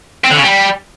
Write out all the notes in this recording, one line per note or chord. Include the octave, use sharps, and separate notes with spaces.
C4
D3
C#3
G3